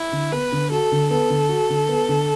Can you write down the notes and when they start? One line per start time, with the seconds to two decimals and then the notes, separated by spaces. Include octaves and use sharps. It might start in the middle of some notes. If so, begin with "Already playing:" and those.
Already playing: E4
0.12 D3
0.32 B3 B4
0.52 D3
0.71 F#4 A4
0.92 D3
1.10 B3 A4
1.30 D3
1.49 F#4
1.70 D3
1.89 B3
2.09 D3